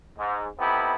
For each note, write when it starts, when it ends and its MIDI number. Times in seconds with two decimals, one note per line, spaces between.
0.18 0.46 44
0.58 0.96 59
0.58 0.96 60
0.58 0.96 63
0.58 0.96 64
0.58 0.96 67
0.58 0.96 69